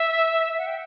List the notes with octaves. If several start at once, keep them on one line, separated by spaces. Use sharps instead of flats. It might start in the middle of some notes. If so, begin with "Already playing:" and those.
Already playing: E5
F#5
G5